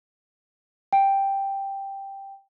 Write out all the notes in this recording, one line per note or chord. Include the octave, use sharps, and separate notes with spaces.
G5